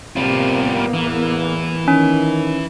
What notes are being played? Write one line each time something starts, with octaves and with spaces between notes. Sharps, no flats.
A2 C3 G3 A#3 B3 F4
E2 E3
D#3 C#4